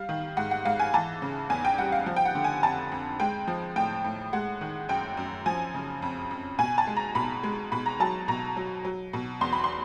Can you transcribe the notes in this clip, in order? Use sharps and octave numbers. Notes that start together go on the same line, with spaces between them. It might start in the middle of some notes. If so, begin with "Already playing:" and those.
Already playing: G3 F5
D#3
G#2 F#5
F#5
G#2 F5
G#5
E3 A5
C#3
E2 G#5
G5
G3 F#5
F5
F3
G5
F#5
D3
G#5
F2 A5
F2
G#3 G5
F3
A2 G5
A2
G#3 F#5
D#3
F#2 G5
F#2
F3 G#5
C#3
F2
F2
B2 G#5
A5
G#3
A#5
B2 B5
G#3
B2 B5
A#5
F#3 A5
B2 A#5
F#3
F#3
B2
E2 C6
B5
C6